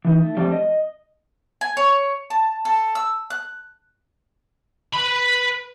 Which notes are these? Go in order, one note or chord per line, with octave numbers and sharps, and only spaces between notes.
E3 D#4
A3
F3 G3 A3 C4 D4 D5
D#5
G#5
C#5
A5
A4
E6
F#6
B4 B5